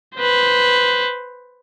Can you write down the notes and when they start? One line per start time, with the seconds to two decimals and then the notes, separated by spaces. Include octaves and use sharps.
0.17 B4 C5